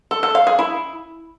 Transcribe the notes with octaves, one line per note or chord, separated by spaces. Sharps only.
A4
A4
F5
G#4
E4